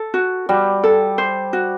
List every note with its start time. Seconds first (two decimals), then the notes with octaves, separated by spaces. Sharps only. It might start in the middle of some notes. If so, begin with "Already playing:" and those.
Already playing: A4
0.14 F#4
0.49 G3 F#4
0.84 A4
1.18 C5
1.53 F#4